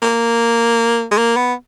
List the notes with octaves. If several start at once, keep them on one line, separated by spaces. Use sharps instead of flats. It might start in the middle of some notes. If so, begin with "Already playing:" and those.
A#3
G#3
A#3
B3